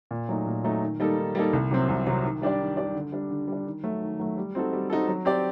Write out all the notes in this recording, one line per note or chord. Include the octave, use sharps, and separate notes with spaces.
A#2
F#3 A3 D#4
A#2
F#3 A3 D#4
D#3
G3 A#3 D#4 A4
D#3
G3 A#3 D#4 A4
C2
C3 F#3 C4
C2
C3 F#3 C4
D#3
G3 D4 G4 D5
D#3
G3 D4 G4 D5
D3
G3 D4
D3
G3 D4
D#3
F#3 A3
D#3
F#3 A3
G3
C4 D#4 F#4 A4
G3
C4 D#4 F#4 A4
F#3
C4 G4 D5